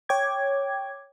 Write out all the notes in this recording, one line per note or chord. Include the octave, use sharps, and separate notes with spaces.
C#5 G5 D6 G#6